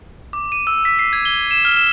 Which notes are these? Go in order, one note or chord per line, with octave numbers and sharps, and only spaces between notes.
D6
D#7
E6
B6
C7
G#6
G7
E7
F6
E7